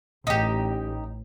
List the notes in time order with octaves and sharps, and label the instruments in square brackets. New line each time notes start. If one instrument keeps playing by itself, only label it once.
[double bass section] A1 [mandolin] D#4 G4